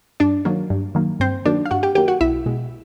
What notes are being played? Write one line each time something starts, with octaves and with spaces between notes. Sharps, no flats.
G2 D4 D5
D#3 F#3 A#3
G2
D#3 F#3 A#3
G2 C4 C5
D#3 F#3 A#3 D4 D5
F5
G2 F#4 F#5
G4 G5
D#3 F#3 A#3 G4 G5
F#4 F#5
B1 E4 E5
B2 G#3